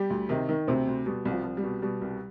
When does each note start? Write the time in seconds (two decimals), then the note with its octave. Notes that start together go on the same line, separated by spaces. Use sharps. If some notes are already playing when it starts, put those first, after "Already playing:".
Already playing: G3 G4
0.10 D2
0.29 C3 D#3 D#4
0.49 D#3
0.67 D2 C3 C4
0.87 D2
1.06 B2 G3
1.25 C2
1.31 F3
1.44 C2
1.57 G3
1.63 B2
1.82 B2 G3
2.02 C2